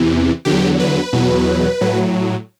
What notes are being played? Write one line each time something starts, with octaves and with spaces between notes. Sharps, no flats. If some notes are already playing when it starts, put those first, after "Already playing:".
Already playing: E2 C3 E3
E2 D3 F#3 G4
B4
E2 B2 F#3
A2 F#3